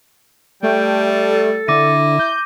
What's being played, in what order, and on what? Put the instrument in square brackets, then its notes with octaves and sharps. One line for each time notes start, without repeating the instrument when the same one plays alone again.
[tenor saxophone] G3 [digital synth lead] A3 [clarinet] G5
[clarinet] A4
[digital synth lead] D3 [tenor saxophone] E4 [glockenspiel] D6 A#6 D#7
[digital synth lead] G6